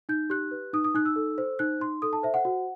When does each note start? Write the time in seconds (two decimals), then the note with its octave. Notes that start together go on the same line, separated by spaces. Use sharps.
0.09 D#4 G6
0.30 G4 F#6
0.51 B4
0.73 D#4 D#6
0.84 D#6
0.95 D#4 F#6
1.05 E6
1.16 A4
1.38 C5
1.59 D#4 F#6
1.80 D#4 C6
2.02 A4 D#6
2.13 A5
2.23 C5 E5
2.34 F#5
2.45 F#4